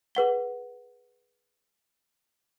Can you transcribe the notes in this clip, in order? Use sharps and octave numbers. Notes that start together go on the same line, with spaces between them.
G#4 B4 F#5 G7